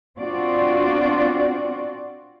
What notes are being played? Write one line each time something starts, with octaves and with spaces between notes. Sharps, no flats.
C4 D4 F4 F#4 D5